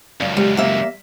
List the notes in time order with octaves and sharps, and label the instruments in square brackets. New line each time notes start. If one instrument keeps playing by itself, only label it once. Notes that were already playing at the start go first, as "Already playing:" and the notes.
[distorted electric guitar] C#2 F#2 [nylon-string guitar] D5 F5
[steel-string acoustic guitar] G3 [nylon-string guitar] G#3
[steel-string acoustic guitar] A#3 E5